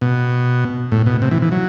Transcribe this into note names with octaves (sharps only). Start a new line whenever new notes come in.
B2
A2
B2
C3
E3
E3
F#3